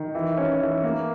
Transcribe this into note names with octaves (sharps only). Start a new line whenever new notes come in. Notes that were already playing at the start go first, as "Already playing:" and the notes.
Already playing: D#3
E3
C#4
E3
A#3